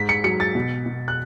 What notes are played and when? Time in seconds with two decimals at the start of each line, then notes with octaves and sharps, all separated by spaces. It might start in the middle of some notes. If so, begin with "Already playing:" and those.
Already playing: G#2 B6
0.09 C#7
0.24 F#3 C#7
0.40 A6
0.55 B2
0.86 B2
1.08 F#6